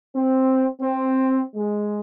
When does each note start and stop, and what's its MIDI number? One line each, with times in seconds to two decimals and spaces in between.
0.15 0.66 60
0.81 1.41 60
1.56 1.99 56